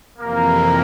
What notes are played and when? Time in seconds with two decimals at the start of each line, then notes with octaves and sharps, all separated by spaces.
0.19 F2 C3 E3 A#3